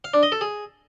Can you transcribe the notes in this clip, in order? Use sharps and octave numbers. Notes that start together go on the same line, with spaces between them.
F5
D4
D#5
A4
G#4